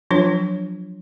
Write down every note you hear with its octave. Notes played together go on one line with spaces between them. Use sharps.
F3 F#3 D4 F4 C#5